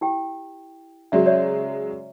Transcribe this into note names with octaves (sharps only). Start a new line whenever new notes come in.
E4 G4 G5
C#3 F#3 G#3 F#4 D5 E5
C#5 D5 E5